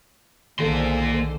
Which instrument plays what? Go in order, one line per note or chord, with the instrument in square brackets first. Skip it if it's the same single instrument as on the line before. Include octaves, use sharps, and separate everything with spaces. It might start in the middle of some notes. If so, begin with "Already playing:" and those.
[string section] B1 D3 C5 [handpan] D#3 G#4 A4 [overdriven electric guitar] A#3 C6